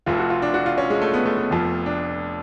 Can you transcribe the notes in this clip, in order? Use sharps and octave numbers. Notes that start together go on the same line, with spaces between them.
F1 F2 F3 F4
F#4
F4
D4
F#4
F4
C#4
G#3
A3
B3
A3
B3
F1 F2 F3
D4